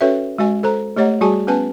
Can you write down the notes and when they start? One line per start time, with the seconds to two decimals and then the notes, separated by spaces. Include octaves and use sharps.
0.01 C#4 F#4 A4 B4 C#5 E5
0.38 G#3 F#4 D#5 G#5
0.63 A4 C5 A#5
0.96 A3 G4 C#5 D#5 F#5 A#5
1.21 G3 F#4 G#4 G#5 A5
1.47 B3 C#4 B4 G#5 A5